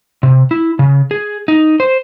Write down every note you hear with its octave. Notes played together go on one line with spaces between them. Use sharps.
C3
E4
C#3
G#4
D#4
C5